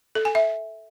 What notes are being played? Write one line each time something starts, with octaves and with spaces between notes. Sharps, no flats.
A4
G#5
E5